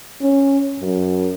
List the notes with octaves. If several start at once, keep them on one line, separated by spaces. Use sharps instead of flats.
C#4
F#2